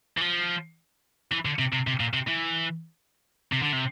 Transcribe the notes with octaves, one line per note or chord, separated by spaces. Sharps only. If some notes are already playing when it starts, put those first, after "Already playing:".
E3
F3
E3
D3
C3
C3
C3
A#2
C3
E3
C3
D3
C3